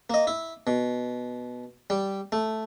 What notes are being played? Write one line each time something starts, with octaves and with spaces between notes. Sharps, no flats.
A#3 D#5
E4
B2
G3
A3